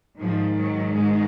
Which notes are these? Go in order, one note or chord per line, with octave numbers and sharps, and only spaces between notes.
G#2 D#3 F3
F#3
G#3